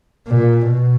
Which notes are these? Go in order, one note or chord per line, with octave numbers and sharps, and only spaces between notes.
A#2
B2